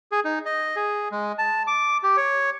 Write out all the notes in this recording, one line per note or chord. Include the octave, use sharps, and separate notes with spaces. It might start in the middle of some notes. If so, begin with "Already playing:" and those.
G#4
D#4
D#5
G#4
G#3
A5
D6
G4
C#5